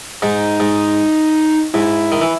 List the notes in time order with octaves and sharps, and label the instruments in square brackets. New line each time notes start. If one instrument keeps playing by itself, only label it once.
[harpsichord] G#2 [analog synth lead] D#4
[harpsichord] G#2
[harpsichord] G#2 [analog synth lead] E4
[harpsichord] D#3
E3